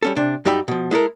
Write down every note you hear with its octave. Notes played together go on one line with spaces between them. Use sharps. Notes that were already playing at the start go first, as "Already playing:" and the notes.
G3 C#4 A4
C3 D4
F#2 G3 D#4 G4 E5 B5
B2 F3
G#3 E4 A4 A#4